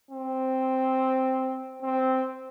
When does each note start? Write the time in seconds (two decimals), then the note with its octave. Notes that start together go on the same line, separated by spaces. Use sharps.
0.11 C4
1.82 C4